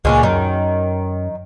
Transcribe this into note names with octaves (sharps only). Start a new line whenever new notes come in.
C#2 A#2 G#3 C#4 D4
F#2 D#3